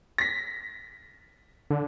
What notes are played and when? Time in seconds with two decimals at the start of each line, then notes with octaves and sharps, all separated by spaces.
0.18 A#6 B6
1.70 D3